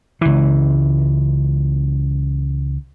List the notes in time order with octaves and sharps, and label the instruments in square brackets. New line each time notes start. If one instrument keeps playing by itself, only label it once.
[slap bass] C#2 E3